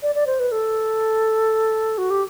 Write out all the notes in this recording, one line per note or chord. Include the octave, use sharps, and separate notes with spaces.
D5
D5
C5
B4
A4
F#4
G4